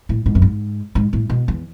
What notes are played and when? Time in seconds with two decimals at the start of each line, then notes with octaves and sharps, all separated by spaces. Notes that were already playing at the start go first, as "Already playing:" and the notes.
0.09 A2
0.26 G#2
0.35 F#2
0.42 G#2
0.95 G#2
1.13 A2
1.30 B2
1.48 E2